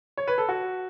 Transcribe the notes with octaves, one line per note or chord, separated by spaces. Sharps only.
C#5
B4
A4
F#4